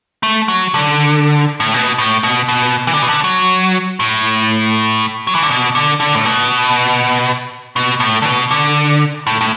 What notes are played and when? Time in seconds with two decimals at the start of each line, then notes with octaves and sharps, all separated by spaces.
0.23 A3
0.48 F#3
0.74 D3
1.60 A2
1.74 B2
1.98 A2
2.23 B2
2.48 B2
2.87 E3
2.94 D3
3.02 B2
3.08 D3
3.24 F#3
4.00 A2
5.27 F#3
5.35 E3
5.43 D3
5.50 B2
5.75 D3
6.00 D3
6.15 A2
6.26 B2
7.76 B2
8.00 A2
8.22 D3
8.26 B2
8.51 D3
9.27 A2
9.41 A2